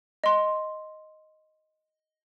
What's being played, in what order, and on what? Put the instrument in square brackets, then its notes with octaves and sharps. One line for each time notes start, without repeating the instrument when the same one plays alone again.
[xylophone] D#5 C6